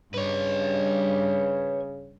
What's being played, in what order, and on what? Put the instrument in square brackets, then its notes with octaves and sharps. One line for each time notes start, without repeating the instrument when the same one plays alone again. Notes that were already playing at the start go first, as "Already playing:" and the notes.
[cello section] G2 [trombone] C#3 [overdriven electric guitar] B4 C#5